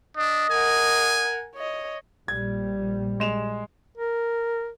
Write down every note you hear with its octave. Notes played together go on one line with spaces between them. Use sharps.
D4 D#5
A#4 F#5 G#5
C#5 D#5
A#1 G3 G#6
G#3 E7 F7
A#4